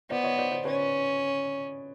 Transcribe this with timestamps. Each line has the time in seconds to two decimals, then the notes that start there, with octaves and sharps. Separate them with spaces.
0.10 B3 C5 D5
0.24 C#5 D#5
0.38 C5 D5
0.51 C5 D5
0.65 C#4 B4 C#5